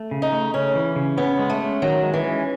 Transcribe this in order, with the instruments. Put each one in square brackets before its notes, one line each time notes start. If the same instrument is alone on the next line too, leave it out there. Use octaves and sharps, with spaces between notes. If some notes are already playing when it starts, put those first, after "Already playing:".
Already playing: [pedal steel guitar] A3
C#3
[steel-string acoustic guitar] D#4
[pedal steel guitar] A3
[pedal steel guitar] C#3 [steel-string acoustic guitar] C#4
[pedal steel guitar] E3
C#3
[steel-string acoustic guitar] B3 [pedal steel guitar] C#4
[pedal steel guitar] G#3
[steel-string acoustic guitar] A3
[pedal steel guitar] C#4
[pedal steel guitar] D#3 [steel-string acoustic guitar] F#3
[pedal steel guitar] G#3
[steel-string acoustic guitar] E3
[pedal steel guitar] C#4